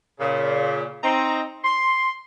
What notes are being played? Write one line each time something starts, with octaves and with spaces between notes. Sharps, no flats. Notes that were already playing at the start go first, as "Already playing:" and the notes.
A#2 C#3
C4 D#4 A#5
C6